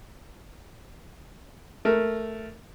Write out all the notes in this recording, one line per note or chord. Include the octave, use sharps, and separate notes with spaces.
A3 A#4